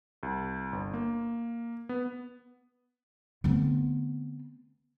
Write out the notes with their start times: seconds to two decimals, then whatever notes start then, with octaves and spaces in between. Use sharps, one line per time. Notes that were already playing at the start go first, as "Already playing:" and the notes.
0.23 C2
0.73 G1
0.94 A#3
1.89 B3
3.44 D3 A3 B3 C4